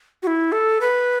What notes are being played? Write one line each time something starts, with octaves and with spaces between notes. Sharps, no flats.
F#4
E4
A4
B4